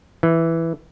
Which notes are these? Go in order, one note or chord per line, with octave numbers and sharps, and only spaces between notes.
E3